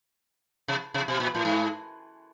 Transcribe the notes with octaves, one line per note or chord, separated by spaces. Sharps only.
C3
C3
B2
A#2
A2
G#2